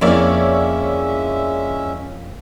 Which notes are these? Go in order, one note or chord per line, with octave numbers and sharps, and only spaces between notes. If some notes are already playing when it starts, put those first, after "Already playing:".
F2 G#3 A#3 C#4 E4 C#5 D5 E5